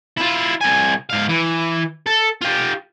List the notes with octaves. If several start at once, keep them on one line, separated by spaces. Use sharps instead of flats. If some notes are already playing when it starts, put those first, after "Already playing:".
E4 F4
C2 G#5
G#2 F5
E3
A4
F4 G4